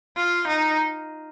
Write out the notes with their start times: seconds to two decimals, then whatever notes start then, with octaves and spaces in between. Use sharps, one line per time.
0.16 F4
0.47 D#4